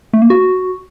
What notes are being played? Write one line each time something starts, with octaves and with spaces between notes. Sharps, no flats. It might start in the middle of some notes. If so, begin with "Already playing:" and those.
A3
A#3
F#4